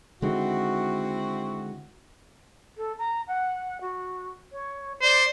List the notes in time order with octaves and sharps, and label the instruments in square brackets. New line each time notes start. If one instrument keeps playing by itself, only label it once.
[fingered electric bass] D3 D#3 G#3 [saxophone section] C4 E4 F#4
[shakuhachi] A4
A#5
F#5
F#4
C#5
[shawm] C5 [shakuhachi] D5